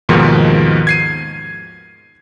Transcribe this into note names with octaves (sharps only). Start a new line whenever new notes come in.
D#2 G#2 B2 D#3 F3
G#6 C7 D#7